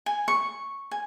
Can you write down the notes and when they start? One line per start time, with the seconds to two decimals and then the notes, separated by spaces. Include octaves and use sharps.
0.06 G#5
0.28 C#6
0.91 G#5